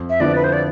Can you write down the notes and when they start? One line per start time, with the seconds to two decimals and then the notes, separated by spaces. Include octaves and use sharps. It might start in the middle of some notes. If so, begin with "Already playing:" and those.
Already playing: F2
0.10 E5
0.20 D3 F3 B3 E4 D5
0.35 B4
0.44 C5
0.53 D5